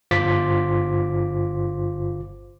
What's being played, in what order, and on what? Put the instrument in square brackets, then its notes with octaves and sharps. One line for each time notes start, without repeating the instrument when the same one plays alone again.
[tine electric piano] G1 F4 C5 D6 B6